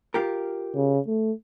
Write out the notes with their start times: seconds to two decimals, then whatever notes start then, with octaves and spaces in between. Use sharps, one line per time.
0.14 F4 G4 A#4
0.75 C#3
1.07 A3